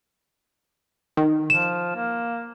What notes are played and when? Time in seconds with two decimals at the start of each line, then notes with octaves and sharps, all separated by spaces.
1.17 D#3
1.50 F3 E7
1.96 A#3